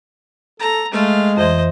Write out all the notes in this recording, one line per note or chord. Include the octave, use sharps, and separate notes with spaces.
A4 A#5
G#3 A3 F5
F2 E3 C5 D#5